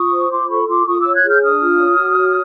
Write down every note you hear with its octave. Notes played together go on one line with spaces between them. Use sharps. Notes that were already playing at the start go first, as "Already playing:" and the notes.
Already playing: F4 C#6 D#6
C5
F4 C6 D6
A4 B5 C#6
F4 C6 D6
F4 C#6 D#6
C#5 D6 E6
F#6 G#6
G#4 F6 G6
D4 D#6 F6
F4
C#5
F#4
C#5